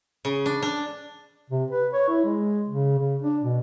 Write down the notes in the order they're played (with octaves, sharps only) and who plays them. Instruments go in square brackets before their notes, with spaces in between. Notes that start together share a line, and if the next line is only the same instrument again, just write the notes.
[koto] C#3
D4
D4
[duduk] C3
B4
C#5
E4
G#3
C#3
C#3
D4
B2